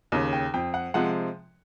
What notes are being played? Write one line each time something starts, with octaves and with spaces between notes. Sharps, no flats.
D#2 C#3
G5
F2 G5
F#5
C3 F3 G#3 F#5